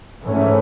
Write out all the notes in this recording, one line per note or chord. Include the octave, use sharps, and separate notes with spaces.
G#2 E3 A3 C#4